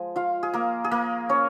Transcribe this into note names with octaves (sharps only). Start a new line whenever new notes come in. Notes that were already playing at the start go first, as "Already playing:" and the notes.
Already playing: F3 G#3 G#5
F4 F5
G#4
A#3 A#4
G#4
A#3 A#4
C#4 C#5